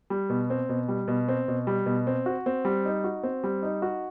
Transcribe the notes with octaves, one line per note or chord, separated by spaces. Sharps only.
G3
B2
C4
B2
G3
B2
C4
B2
G3
B2
C4
F#4
C4
G3
D#4
F#4
C4
G3
D#4
F#4